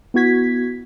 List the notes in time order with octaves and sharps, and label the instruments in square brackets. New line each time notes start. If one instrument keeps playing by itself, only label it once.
[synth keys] B3 E4 F#4 G#6 B6